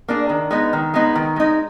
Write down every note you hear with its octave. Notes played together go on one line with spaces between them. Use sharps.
A#3 D4 G#4
D#3
G#3 B3 D#4
D#3
G#3 B3 D#4
D#3
G#3 D#4